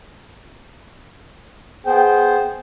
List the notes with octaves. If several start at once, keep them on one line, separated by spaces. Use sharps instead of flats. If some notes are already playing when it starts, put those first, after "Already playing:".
B3 G#4 C5 G5